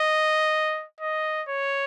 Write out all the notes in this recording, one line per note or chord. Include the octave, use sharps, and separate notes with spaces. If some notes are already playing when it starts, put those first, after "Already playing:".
Already playing: D#5
D#5
C#5